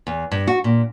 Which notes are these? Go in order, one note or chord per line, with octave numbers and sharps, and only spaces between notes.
E2
G2
F#4
A#2